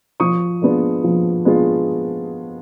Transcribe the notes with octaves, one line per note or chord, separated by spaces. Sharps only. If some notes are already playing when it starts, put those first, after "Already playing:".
F3 C#6 D#6
G#3 B3 D4 F4
F3
G#3 B3 D4 F4